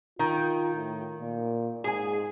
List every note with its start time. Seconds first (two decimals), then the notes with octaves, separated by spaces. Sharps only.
0.19 D#3 F4
0.76 A2
1.20 A#2
1.84 G#2 G#4 G#5